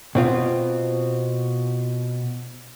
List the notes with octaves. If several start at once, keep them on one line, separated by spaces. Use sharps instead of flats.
B2 C4 F4